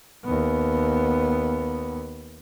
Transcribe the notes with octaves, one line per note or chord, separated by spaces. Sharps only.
D#2 B3